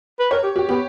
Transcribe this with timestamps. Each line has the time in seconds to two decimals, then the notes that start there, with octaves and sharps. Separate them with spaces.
0.20 B4
0.31 A#4 C#5
0.43 G4
0.56 F#4 G4
0.69 B3 G4